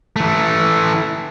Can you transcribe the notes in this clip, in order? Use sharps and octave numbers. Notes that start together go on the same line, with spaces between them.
E3 A3